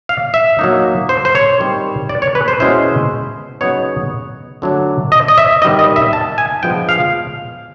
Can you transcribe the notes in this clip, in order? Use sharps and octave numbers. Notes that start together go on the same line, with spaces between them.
F5
E5
F#3 A#3 D#4
C5
C5
C#5
D#3 G3 C4
D5
C#5
B4
C5
B2 G#3 C#4 E4 C5
C#3 F#3 B3 D#4 C#5
D3 F#3 A3 D4
D#5
D#5
E5
D#3 G3 B3 D#4 D#5
D#5
E5
A5
G#5
F3 G#3 B3 D4 G5
F5